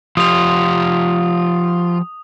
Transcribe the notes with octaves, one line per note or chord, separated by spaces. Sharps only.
F3 F4 G4 D#6 F7